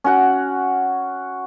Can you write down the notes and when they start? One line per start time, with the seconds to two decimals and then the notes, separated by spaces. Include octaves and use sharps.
0.04 C#4 F#4 F#5